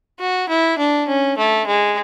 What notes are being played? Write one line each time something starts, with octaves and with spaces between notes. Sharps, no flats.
F#4
E4
D4
C#4
A3
G#3